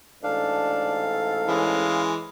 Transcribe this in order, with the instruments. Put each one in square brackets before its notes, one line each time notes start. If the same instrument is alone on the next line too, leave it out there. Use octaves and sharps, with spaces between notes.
[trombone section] A1 G#2 A4 [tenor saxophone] D4 [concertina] F5
[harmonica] E3 G#3 [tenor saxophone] C#4